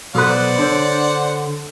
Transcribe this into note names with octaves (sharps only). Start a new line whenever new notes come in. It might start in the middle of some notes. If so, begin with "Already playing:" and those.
B1 F#4 A4 B4 C5 D5 F#5 A#5
D3 D4 C#5